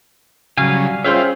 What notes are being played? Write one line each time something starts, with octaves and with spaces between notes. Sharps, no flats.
C#3 F#3 G3 F5 G#5
C#4 F4 G#4 C5 E5 F5 G5